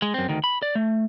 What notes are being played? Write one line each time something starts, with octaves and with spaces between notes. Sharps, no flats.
G#3
F#2 C4
D2 D#3
B5
D5
A3